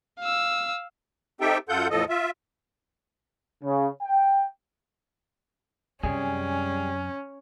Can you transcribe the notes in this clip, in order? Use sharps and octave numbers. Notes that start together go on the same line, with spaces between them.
F5 E6
C4 D#4 G4 A4 E5 G5
F#2 F4 A4 F#5 G6
E2 A2 F3 A4 D#5
F4 E5
C#3
G5
F#2 C3 G3 C#4 G#4